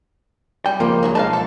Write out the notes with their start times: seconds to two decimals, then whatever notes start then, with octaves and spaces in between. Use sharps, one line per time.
0.66 G3 G5
0.80 C#2 F3 A#3
1.03 F#3 G#4 C#5
1.15 B1 G#3 B4 F5 A5
1.33 A4